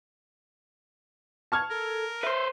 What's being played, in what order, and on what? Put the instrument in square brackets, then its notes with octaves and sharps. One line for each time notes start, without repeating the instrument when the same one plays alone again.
[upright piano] A5 F6 G#6 [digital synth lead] C#6
[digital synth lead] A4 [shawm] A#4
[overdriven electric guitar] B4 C5 [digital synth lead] E5